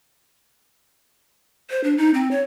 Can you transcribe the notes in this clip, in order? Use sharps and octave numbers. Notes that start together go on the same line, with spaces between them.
C5
D4
D#4
C4
C#5